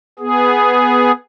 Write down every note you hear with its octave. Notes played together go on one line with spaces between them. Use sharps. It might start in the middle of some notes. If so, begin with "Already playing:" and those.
B3 G#4